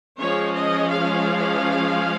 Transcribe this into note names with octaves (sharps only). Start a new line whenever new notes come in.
F3 G#3 C#4 C#5
D#5
F5